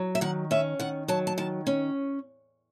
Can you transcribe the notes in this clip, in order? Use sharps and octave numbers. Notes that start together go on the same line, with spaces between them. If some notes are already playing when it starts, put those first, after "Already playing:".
Already playing: F#3
E5
D#3 F#5
C#4 E5
D#3 F#5
F#3 A5
A5
D#3 A5
C#4